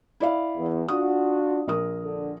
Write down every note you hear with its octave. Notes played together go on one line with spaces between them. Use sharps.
E4 D5 F5
E2
D4 F4 F#4 D#6
A#1 A#4 D#6
D3